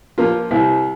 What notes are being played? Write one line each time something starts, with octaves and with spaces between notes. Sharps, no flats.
F3 A#3 F4
C2